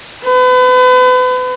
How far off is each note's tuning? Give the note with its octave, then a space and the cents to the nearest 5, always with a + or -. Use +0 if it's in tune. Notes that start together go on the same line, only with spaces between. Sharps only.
B4 +35